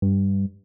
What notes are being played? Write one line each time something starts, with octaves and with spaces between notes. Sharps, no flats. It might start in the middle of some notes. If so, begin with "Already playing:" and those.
G2